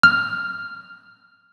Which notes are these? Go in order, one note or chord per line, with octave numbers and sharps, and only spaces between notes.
F6